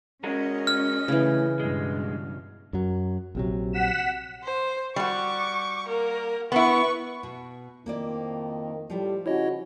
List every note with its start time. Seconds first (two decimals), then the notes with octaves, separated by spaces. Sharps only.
0.24 G#3 C#4 F#4 A#4 D#5
0.67 F6
1.08 A2 C#3 E3
1.60 G2 B2 G#3
2.73 F#2 F#3
3.35 A#1 C3 F#3
3.73 F#5 B6 E7
4.44 C5
4.96 G3 F#4 C#6 D6
5.87 A#3 A#4
6.52 B3 E4 B4 C#6
7.23 B2
7.86 F2 D#3 A#3 E4 D5
8.90 A2 F3 G3 G4
9.26 C#3 C#4 E4 F#4 C#5 D#5